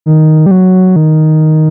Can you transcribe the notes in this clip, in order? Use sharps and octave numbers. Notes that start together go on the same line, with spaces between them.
D#3
G3
F#3
D#3